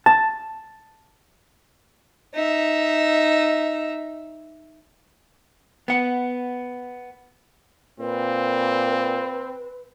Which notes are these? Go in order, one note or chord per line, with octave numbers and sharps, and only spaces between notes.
A5
D#4 E5
B3 F#5
A#2 C4 B4